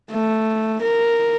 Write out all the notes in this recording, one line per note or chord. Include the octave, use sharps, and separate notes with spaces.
A3
A#4